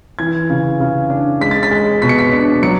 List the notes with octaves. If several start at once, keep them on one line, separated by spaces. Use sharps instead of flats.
E3 G#6
C#3
C#3
D4
G#3 B6
A6
B6
G#3
B2 B6
C#7
B6
D4
F#3 C#7